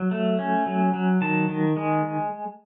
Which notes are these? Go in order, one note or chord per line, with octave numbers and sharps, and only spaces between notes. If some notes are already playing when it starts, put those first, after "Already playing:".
Already playing: F#3
A3
C#4
F#3
F#3
D#3 A5
D#3
G#3